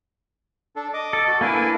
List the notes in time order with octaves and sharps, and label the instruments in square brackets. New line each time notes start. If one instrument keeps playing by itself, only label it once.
[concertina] D4 A4
D#5 D6
[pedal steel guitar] A4
[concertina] F#4
[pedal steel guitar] A#3 D4 E4 [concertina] A4 B4 G#5